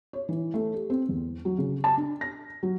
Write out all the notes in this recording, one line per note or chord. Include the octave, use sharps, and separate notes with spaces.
C#5
E3
A3
G4
C4
E2
F#3
C#3
A5
D4
A#6
F#3